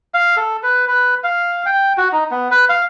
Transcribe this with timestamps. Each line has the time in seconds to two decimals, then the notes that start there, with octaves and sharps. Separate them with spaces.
0.14 F5
0.37 A4
0.63 B4
0.88 B4
1.24 F5
1.66 G5
1.98 F#4
2.12 D#4
2.31 B3
2.51 B4
2.69 F5